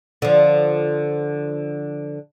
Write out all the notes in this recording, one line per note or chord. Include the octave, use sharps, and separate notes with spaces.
D3 F3